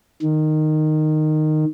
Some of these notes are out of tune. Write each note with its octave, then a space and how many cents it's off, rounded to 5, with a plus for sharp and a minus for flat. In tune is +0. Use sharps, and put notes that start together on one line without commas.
D#3 -10